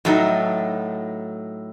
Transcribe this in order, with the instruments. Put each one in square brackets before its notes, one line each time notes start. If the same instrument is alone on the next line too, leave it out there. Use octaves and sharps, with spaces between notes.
[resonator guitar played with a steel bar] A2 F#3 A3 D#4